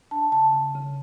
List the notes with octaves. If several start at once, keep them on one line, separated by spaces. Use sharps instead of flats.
D4 A5
C#3 A5
C#3
C#3